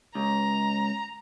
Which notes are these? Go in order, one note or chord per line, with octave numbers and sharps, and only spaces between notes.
C#2 A#5